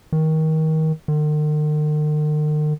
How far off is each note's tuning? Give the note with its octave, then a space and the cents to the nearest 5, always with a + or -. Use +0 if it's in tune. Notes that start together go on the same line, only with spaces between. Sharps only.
D#3 +25
D#3 -45